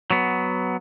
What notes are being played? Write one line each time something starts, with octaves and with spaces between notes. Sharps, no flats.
F#3 B3